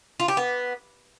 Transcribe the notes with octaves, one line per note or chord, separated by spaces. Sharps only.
F4
G4
B3